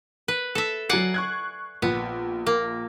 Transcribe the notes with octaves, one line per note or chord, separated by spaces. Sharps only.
B4
A4 E5
F#3 D5 F#5 G#5 C7
C#6 F#6 G#6
A#1 B3
A#3